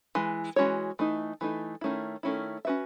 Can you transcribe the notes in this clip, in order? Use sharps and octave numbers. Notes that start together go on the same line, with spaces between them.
E3 G#3
E3 G#3 C#4 F#4 C#5
E3 A3 D#4
E3 A3 D#4
D#3 A3 C#4 E4
D#3 A3 C#4 E4
C#4 F#4 B4 E5